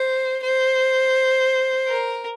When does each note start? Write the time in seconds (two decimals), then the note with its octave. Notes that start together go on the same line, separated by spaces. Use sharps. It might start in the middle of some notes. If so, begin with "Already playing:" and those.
Already playing: C5
0.43 C5
1.88 A#4